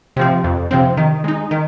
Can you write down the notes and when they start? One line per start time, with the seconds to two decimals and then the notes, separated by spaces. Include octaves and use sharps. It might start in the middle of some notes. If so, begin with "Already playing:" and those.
0.17 C3 F3 C4
0.44 F2
0.71 C3 F3 C4
0.97 D#3
1.24 G#3 D#4
1.51 D#3